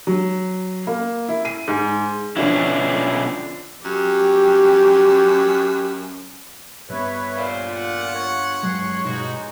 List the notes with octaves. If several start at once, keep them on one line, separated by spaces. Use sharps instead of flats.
F#3
A#3
E4
D#7
G#2
B2 D3 F3 C#4 D4 E4
F#2 G4
G2 B3 B4 C#5 E5
A#2 C5
F4 F#5
C#5
G2 F#3 G#3 C6 F#6
G2 B2 G#3 D#4 F#4